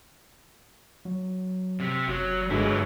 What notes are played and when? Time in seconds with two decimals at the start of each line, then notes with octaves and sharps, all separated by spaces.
1.05 F#3
1.80 C3
2.08 F#1 F#3
2.50 G1 F#3 G#3 E4